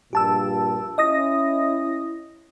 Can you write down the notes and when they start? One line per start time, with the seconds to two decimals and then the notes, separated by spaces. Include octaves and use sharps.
0.13 A#1 G2 A#2 G4 A5 E6
0.98 C#4 E4 D#5 D#6 A#6